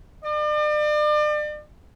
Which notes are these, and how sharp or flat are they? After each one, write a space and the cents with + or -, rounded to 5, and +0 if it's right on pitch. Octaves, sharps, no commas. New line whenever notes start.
D5 +40